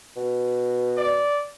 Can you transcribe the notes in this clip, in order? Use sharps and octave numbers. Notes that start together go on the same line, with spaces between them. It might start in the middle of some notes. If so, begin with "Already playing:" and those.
B2
D5